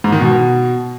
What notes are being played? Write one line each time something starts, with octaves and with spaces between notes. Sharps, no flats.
G#2
D#3
B2